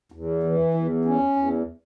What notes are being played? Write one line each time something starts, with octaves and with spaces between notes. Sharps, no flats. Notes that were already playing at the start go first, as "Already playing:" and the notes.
E2
E3
E2
C#4
E2